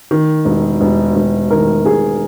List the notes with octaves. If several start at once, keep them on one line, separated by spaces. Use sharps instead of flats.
D#3
E1
E1
E1
D#3 A#4
E1 G#4